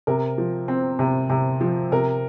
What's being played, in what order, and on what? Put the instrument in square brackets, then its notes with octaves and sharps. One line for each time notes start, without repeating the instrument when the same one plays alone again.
[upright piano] C3 A#4
F3
C4
C3
C3
F3
C3 A#4